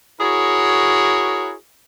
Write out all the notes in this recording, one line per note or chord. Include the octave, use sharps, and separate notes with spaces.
E4 F#4 G#4 A#4 C#5